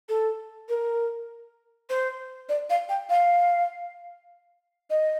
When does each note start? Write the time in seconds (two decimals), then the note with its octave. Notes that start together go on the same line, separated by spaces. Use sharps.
0.09 A4
0.69 A#4
1.90 C5
2.49 D5
2.70 F5
2.89 G5
3.10 F5
4.90 D#5